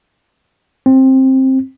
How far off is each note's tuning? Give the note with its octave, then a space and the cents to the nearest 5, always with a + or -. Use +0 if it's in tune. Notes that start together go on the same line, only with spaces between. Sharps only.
C4 +15